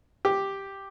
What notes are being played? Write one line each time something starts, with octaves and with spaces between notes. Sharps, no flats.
G4